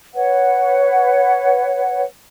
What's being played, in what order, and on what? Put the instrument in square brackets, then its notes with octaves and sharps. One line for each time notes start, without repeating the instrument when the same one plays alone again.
[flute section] B4 C#5 F#5